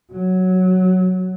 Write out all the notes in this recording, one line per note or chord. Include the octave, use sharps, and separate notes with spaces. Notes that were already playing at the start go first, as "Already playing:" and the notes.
F#3